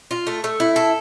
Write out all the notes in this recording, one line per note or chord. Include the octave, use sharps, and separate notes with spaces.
F4
A3
A3
E4
A4